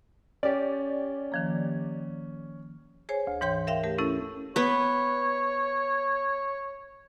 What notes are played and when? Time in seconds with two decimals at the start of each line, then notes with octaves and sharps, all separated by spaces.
0.43 C#4 G4 D5
1.32 D#3 F3 A#3
3.09 G#4 C5 C#5 G#5
3.27 D2
3.41 G#2 E3 C#5 G5 C6 G6
3.67 A#4 E5 F5 G5
3.83 A3 G4 A#4
3.98 A3 C#4 E4 A4
4.56 B3 B4 C#5